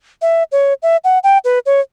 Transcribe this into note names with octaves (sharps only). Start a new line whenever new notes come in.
E5
C#5
E5
F#5
G5
B4
C#5